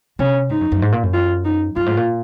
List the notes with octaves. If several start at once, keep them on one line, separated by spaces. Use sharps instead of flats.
C3 C#4
G#2 D#4
F#2
F#2
G#2
A#2
F#2
F4
D#4
F#2 F4
G#2
A#2